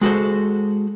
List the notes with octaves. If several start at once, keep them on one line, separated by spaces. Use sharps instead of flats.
G#3 F#4 A4 C5